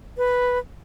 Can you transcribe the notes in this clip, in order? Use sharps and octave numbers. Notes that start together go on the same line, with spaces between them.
B4